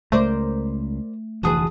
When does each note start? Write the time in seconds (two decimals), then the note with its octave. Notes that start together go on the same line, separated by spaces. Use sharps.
0.12 C#2 A3 A#4 C5 D5
1.43 F1 D2 E3 F#4 G#4 B4 A5 D#6